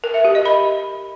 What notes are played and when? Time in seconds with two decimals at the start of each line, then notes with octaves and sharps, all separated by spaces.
0.04 A#4
0.14 E5
0.25 G4
0.35 D#5
0.45 B5